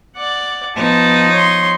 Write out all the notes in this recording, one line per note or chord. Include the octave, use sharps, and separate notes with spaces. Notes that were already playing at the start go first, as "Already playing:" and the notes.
D5 F#5
F3 B3 D#4 A5
C#5 C6